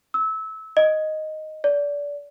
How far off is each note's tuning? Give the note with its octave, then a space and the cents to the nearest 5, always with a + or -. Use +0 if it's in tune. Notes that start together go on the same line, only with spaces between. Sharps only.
E6 -25
D#5 +0
D5 -25